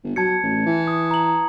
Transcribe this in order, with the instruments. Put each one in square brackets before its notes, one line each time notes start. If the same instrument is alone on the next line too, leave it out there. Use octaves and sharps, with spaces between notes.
[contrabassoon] G1
[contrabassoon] F#3 [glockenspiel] A5 G#6 C#7
[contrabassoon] A1
E3
[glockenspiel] D#6
A#5 F#7